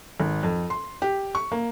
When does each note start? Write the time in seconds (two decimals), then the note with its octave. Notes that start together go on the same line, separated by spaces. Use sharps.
0.20 G#1
0.43 F2
0.70 C6
1.02 G4
1.35 C#6
1.52 A#3